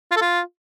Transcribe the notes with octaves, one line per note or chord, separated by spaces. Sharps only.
F4
A4
F4